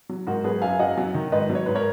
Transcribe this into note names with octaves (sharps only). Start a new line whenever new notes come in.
F#3
G#2 F#4 A#4
F#3 G#4 B4
F#2 F5 G#5
F#2 D#5 F#5
F#3
D#3
G#2 B4 D#5
F#3
C#5
G#2 B4
A#4 C#5